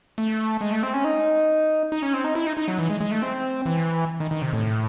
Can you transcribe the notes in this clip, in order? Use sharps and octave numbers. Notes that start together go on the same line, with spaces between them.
A3
G#3
A3
C4
C#4
D#4
D#4
C#4
C4
D#4
E4
D#4
D#4
F#3
E3
G#3
G#3
A3
C4
E3
D#3
D#3
C3
A2